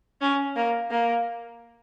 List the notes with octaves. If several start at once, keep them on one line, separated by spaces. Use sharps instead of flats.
C#4
A#3
A#3